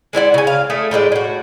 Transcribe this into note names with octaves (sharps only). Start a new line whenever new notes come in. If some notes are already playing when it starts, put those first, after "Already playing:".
G#3 E4 D5 F#5
C#3 G#5
F5
A3 E4 G#4
A2 G3 G#3 D5
A2 F#4